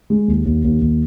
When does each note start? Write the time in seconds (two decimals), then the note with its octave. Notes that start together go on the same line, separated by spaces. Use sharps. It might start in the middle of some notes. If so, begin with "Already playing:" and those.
0.10 G#3
0.28 D#2
0.45 D#2
0.64 D#2
0.81 D#2